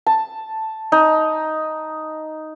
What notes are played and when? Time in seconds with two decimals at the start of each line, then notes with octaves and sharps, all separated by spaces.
0.06 A5
0.92 D#4